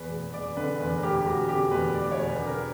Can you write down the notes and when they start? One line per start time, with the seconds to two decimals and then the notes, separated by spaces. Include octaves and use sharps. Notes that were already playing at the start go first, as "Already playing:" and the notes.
Already playing: E2 B4
0.10 E1
0.34 E1 D5
0.56 D3 B4
0.79 E2 B4
0.97 A#4
1.03 E1 G4
1.20 G4
1.25 E1 F#4
1.48 D3 G4
1.71 E2 B4
1.94 E1 D5
2.12 C#5
2.17 E1
2.29 B4
2.41 D3
2.46 A#4